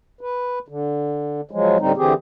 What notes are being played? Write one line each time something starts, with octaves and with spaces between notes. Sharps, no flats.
B4
D3
F3 F#3 G#3
A2 D3 G3 C4 D#4
D3 E3 C4 G4 G#4